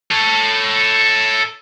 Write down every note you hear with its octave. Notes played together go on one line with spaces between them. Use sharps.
A4 C#5